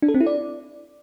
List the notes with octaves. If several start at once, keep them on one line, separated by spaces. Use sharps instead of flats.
D4
A4
C4
E4
D5